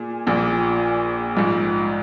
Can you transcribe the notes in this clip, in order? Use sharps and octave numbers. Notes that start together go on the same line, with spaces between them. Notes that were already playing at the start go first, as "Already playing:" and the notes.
Already playing: A#2 G#4
A#1 A#2 F3
A#1 G#2 F3